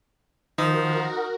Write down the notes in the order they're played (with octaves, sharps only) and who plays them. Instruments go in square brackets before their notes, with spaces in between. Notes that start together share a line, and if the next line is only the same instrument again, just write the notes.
[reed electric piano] D#3 [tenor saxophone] F3 [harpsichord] D#4 [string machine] F#4 A#4